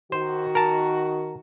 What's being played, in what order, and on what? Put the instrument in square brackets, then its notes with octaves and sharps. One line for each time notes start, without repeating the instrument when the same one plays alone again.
[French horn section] D#3 F#4 [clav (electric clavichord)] C5
[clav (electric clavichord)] A#4 A5